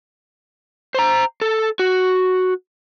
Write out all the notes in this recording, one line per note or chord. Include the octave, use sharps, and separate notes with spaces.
C5 A#5
A4
F#4